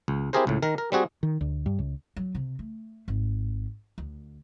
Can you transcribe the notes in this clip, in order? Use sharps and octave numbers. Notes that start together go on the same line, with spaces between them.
C#2
C4 E4 G4 G#4 A#4 C5
C#2 A2
D#3 A#4
A#4
G3 C4 F#4 G#4
D#3
D2
G2
C#2
F#3
C3
A3
G#1
D2